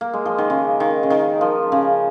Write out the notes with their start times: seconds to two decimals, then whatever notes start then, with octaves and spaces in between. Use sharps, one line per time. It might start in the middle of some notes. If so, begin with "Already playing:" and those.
0.01 A#3
0.13 G#3
0.26 F3
0.38 D#3
0.50 C#3
0.80 D#3
1.03 C#3
1.10 D#3
1.41 F3
1.72 C#3